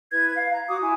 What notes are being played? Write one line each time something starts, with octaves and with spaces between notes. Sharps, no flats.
E4 B4 G#6
F5
A#5
F#4 D6 D#6
E4 G#5